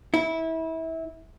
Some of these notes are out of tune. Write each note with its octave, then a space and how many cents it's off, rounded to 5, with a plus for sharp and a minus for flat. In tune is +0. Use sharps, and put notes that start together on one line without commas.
E4 -25